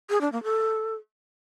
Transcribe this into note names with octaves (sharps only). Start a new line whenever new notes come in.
G#4
D4
A#3
A4